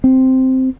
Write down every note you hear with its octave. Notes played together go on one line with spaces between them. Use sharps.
C4